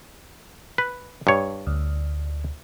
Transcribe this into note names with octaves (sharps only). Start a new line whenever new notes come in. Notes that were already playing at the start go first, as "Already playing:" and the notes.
B4
G2 C#5
D2